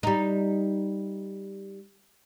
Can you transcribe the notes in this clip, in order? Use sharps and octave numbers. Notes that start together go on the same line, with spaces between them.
G3 D#4